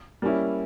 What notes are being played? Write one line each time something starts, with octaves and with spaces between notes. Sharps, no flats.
G3 A#3 C#4 E4